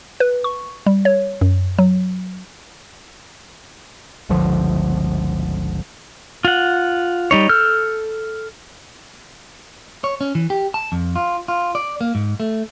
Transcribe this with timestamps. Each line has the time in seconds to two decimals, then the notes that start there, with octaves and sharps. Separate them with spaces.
0.20 B4
0.44 C#6
0.86 G3
1.05 C#5
1.41 F#2
1.79 F#3
4.29 G1 C#2 D3 F3
6.45 F4 F#5
7.31 G3 D#4 C#5
7.49 A4 E6 F6 G6
10.04 C#5
10.21 C#4
10.35 E3
10.50 G4
10.74 A5
10.92 F2
11.16 F4
11.48 F4
11.75 D5
12.01 A#3
12.15 G#2
12.40 A3